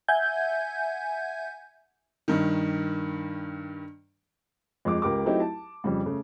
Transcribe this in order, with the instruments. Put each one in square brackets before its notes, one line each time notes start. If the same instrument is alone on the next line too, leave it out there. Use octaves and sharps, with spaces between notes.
[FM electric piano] E5 F#5 G#5 G6 G#6
[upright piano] G2 D#3
F2 G#3 D6
C#2 G4 A#4 D6
F#3 A3 C4 D#4 E4 G4
A5
F2 C#3 G3
C#3 A3